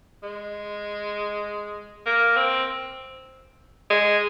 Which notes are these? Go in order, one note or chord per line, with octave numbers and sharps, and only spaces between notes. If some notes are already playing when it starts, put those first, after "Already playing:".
G#3
A#3
C4
G#3